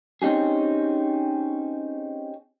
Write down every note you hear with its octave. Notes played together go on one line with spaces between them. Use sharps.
C4 C#4 D#4 G4 G#4